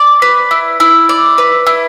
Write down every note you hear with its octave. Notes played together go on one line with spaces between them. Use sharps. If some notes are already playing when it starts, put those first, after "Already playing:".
Already playing: D5
B4
E4
E4
D5
B4
E4